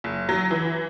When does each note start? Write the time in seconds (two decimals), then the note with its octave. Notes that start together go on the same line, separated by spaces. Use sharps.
0.04 F#1
0.29 F#3
0.51 E3